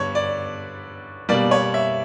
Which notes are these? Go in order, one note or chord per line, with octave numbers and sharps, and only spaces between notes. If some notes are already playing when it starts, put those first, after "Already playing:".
Already playing: G2 D3 G3 B3 C#5
D5
B2 G3 A#3 D5
C#5
E5